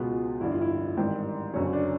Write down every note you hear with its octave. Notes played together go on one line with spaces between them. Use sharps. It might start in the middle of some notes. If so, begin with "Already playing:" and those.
Already playing: C#2 B2 G#3 B3 F4
A1 G2 D3 E4
F4
E4
A1 G#2 D#3 G3 C4
F#1 F#2 D3 C#4
D4